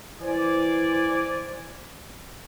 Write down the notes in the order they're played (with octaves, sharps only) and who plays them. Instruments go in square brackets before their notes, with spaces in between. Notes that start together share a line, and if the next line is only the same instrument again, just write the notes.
[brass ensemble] E3 C5 D5 G#5